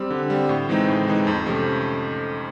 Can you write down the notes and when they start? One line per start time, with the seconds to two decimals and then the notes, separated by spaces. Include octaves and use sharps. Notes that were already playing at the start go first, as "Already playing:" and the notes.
Already playing: G3 C4
0.10 D3
0.30 G3 C4
0.49 A2
0.69 E3 G#3 C4 D#4
0.88 A2
1.07 E3 G#3 C4 D#4
1.27 F2
1.46 C3 F3 A3 C#4